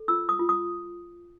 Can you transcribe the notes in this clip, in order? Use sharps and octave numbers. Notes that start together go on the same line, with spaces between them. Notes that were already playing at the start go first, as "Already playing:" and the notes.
Already playing: A4
F4 E6
D#6
F4
D#6